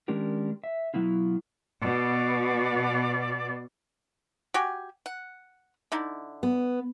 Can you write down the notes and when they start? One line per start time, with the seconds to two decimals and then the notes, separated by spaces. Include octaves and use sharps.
0.08 D#3 G#3 C#4 D4 G4 A#4
0.64 E5
0.94 B2 F#3 B3 E4 F4
1.83 B2 D5
4.54 F#4 G4 G#5
5.06 F#5
5.92 D3 D#4 E4
6.43 B3